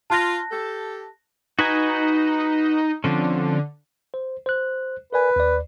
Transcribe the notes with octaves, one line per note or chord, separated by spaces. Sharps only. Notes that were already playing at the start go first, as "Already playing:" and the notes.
F4 A5 F#6 A#6
G4 A4
D#4 F#4 B4 G#5
D3 F3 C4 C#4
C5
C5 F#6
A#4 B4 D5 G#5
D#2 D5